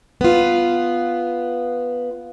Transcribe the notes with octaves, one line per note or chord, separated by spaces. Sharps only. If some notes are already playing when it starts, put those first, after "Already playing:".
B3 F4